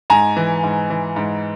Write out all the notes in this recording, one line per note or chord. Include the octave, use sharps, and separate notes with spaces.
G#2 G#5 A#5
E3
G#2
E3
G#2